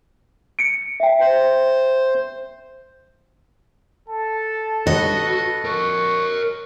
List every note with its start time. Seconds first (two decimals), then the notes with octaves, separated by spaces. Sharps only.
0.59 C#7 D7
1.00 E5 G5
1.20 C5
4.08 A4 A5
4.87 F#4 B4 D#5
5.65 A#4 C#5 C#6